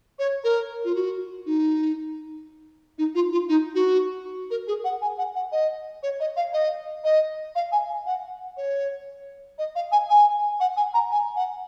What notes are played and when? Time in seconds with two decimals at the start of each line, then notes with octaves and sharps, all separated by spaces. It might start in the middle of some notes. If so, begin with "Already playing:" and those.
0.19 C#5
0.44 A#4
0.85 F4
0.95 F#4
1.46 D#4
2.98 D#4
3.15 F4
3.32 F4
3.49 D#4
3.75 F#4
4.51 A#4
4.68 G#4
4.84 F#5
5.02 G#5
5.18 F#5
5.35 F#5
5.52 D#5
6.03 C#5
6.20 D#5
6.37 F5
6.53 D#5
7.04 D#5
7.55 F5
7.72 G#5
8.06 F#5
8.57 C#5
9.58 D#5
9.75 F5
9.92 G#5
10.09 G#5
10.60 F#5
10.77 G#5
10.94 A#5
11.11 G#5
11.36 F#5